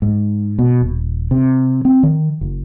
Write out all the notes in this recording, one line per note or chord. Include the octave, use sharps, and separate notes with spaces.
G#2
B2
D#1
C3
C4
D#3
F#1